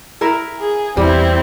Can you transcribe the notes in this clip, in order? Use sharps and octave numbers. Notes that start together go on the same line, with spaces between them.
E4 A#4 E5
G#4
E2 G3 C4 E4